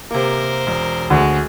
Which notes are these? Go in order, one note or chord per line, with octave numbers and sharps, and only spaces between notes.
C3 A#3 A#4 C5
E1
D2 G#3